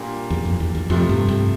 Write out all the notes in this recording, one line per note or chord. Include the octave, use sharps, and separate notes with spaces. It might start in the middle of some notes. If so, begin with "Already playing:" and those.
Already playing: A#2 G3 A#3 D4
E2
F2
E2
E2
C2 F2 C3 F3 A3
G2
G2